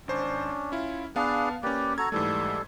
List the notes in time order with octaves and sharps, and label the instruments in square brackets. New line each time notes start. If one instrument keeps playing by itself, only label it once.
[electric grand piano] G#1 C5 [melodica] C#4 D4
[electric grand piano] C#4 E4 [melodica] F4
[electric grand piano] B3 F5 A5 [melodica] D4 G#4 B4
[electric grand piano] A#3 C#4 [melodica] G4 B4 D5
[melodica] F#4 A4 A#5 [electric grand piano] G#6
[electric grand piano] G#2 E3 A3 [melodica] G3 A4